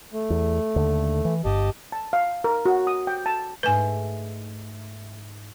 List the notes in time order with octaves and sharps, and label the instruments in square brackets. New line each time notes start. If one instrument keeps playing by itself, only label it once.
[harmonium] A3
[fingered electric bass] E2
D#2 D3
E3
[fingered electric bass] G1 G2 [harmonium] G4 D#5 A5
[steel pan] A5
F5
A#4
F#4
D#6
G5
A5
[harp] G#2 A3 [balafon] B4 G#5